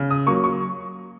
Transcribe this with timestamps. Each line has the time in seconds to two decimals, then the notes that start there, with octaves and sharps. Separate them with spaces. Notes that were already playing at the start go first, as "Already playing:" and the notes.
Already playing: C#3
0.11 D#6
0.26 F#3 A#3 C#6
0.44 C#6